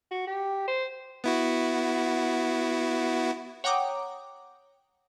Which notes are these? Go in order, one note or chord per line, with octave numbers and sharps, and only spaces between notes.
F#4
G4
C5
B3 E4 F#4
C#5 F#5 G5 A#5 D6 D#6